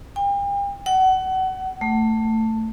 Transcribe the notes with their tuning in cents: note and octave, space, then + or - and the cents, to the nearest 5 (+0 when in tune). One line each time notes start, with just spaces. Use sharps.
G5 +40
F#5 +30
A3 +15